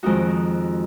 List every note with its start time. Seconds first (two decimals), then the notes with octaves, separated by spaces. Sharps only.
0.03 F2 D#3 G#3 D#4 F#4